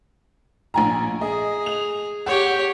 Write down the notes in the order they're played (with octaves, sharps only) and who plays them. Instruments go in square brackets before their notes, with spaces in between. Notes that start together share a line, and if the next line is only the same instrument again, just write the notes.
[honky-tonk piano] A#1 G#5 A#5
[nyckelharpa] G#4 [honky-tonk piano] D#5
[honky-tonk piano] F7
[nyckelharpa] G4 C#5 [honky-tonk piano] F#5